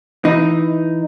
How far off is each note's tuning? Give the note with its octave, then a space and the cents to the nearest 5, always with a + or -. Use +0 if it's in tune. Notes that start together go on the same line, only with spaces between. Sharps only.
E3 +0 D#4 +0